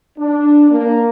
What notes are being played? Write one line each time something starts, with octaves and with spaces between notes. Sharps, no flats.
D4
A#3